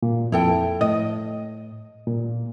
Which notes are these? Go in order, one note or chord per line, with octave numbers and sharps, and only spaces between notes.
A#2
F2 E4 A4 G5
A2 D#5
A#2